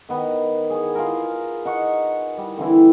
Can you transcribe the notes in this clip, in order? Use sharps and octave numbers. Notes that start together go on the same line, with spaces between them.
D#3 B3
G#4 C#6
F4 G#4 A#4
D#4 F#5 C#6
G3
D3 E3 C4 E4